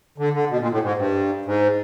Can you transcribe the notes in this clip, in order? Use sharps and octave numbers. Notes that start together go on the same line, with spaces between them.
D3
D3
B2
A#2
A2
G#2
G2
G#2